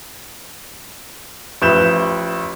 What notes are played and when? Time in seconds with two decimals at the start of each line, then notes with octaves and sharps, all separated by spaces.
1.62 A1 F3 B4 E5 G6 E7